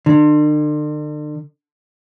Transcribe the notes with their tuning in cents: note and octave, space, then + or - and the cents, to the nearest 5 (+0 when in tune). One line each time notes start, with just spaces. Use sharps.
D3 +40